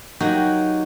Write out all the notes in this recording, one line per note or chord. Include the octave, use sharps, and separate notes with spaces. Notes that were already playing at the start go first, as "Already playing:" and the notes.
F#3 A#3 D#4 F#4 G4